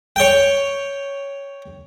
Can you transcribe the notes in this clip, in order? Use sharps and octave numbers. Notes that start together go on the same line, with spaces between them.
C#5 G5